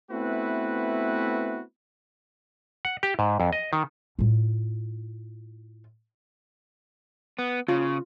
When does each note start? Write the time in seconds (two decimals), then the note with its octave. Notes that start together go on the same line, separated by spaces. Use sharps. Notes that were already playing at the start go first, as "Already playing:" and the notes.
0.11 A3 B3 C4 E4 F#4 B4
2.85 F#5
3.03 G4
3.19 G#2
3.40 F2
3.53 D#5
3.73 D#3
4.19 A2 F4
7.39 B3
7.69 C#3 F4